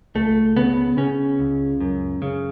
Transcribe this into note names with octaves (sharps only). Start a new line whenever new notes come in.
C#2 A3
C#3 B3
C#3 C#4
C#2
F#2
C#3